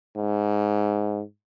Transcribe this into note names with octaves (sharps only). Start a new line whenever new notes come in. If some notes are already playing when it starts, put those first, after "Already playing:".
G#2